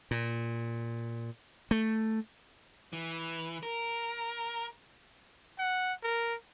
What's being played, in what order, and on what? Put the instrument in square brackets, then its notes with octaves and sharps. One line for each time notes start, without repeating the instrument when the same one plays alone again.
[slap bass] A#2
A3
[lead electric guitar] E3
A#4
[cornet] F#5
A#4